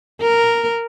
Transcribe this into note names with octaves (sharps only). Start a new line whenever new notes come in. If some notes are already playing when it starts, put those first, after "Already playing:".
A#4